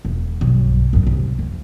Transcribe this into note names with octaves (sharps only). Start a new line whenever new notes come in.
E1
B1 G2
G#1 F#2
C2
F2